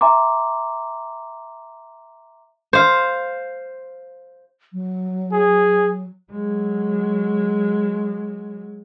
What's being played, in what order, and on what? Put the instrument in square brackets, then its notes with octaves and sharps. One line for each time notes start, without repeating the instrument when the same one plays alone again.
[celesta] E5 G#5 A#5 C6 D6
[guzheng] C5 F5
[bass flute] F#3
[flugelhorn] G#4
[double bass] F#3 G#3